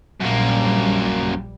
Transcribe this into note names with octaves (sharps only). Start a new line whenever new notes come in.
A#1 F#2 G3 A#3